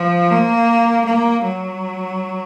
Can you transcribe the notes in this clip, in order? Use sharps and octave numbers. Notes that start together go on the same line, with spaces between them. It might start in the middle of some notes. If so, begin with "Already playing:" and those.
Already playing: F3
A#3
A#3
F#3